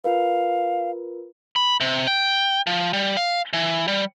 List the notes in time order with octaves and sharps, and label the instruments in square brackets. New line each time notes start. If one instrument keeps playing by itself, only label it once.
[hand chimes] F4 A#4 B4 [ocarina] F5
[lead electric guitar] B5
C3
G5
F3
G3
F5
E3
G3